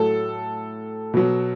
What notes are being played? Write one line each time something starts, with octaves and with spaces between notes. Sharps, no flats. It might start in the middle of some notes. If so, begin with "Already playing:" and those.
Already playing: A2 F#3 A4
B2 F#3